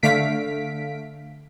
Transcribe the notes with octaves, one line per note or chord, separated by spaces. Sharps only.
D3 A3 F5 B6 D7